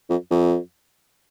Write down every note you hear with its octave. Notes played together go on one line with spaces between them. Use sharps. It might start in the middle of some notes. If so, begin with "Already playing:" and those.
F2
F2